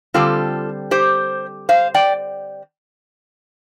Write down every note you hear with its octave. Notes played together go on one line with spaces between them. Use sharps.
D3 G3 C4 F4 A4
G4 C5
C5 F5
D5 G5